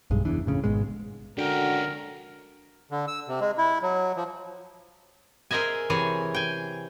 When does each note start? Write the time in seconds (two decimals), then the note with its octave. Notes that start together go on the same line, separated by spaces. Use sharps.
0.11 B1 G2 G#3
0.25 F#1 E2 E3 D4
0.46 F2 A2 C#3
0.64 G#1 G#2 B2 G#3
1.38 C#2 D3 F#4 A#4 G5
2.91 D3
3.08 E6
3.28 C3
3.41 G#3
3.58 E4
3.82 F#3
4.16 F3
5.51 G#4 A#4 C5 D#5 E5 G#5
5.90 C3 E3 G#4 C#5 G#5
6.34 G5 G#5